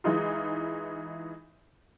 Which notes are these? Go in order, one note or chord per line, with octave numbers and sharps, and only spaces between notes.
E3 G#3 D#4 F4